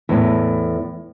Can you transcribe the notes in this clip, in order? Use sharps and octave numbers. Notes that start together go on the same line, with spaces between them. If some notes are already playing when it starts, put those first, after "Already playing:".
E2 A2